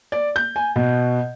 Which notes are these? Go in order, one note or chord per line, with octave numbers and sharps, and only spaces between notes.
D5
G6
G#5
B2